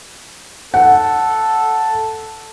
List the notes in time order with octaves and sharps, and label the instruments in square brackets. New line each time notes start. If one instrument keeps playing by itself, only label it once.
[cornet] A4 [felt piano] F#5